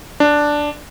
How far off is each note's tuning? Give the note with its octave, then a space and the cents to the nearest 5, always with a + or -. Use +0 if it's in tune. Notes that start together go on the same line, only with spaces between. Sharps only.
D4 +0